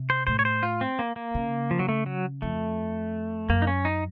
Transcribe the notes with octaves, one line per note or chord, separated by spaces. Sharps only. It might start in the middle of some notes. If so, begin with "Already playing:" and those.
Already playing: C3
C5
A2 C5
C#5
C5
F4
C4
A#3
A#3
C#3
F3
F#3
A3
F#3
F2 A3
F#2 A#3
D#4
C#4
D#4